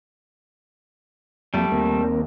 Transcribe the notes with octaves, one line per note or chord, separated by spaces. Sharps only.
F2 F#3 G3 A3 A#3
D#2 A#3 C4 A#4